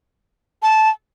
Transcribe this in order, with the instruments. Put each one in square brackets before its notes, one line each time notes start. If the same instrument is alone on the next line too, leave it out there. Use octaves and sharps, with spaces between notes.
[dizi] A5